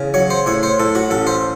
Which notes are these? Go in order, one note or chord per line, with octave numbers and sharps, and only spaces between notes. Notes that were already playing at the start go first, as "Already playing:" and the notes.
Already playing: E2 C#3
F#3 C#5
C5
A2 C#5
C5
A2 A4
F#4
A1 A4
C5